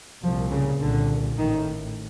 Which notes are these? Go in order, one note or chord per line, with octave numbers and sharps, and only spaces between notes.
C2 A#2 F3
C#3
C2 A#2 D3
A1 A2 D#3